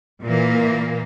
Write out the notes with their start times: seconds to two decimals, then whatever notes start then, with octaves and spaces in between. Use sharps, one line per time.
0.23 A#2 E3 A#3